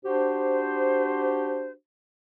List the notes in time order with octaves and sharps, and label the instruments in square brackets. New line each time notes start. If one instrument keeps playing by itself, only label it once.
[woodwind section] D4 F#4 G4 C5